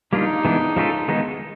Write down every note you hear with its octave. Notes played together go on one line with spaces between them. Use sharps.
G3 A#3 D4 D#4 F4
E3 G#3 B3 D4
F3 G#3 C#4 F4 A4
D#3 G#3 B3 D#4